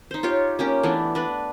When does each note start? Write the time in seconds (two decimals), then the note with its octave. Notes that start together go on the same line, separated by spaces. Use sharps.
0.11 D#4 C5
0.23 F4 G4 C#5
0.59 A#3 C#4 G4
0.83 E3 A3 B3 D4
1.15 D4 B4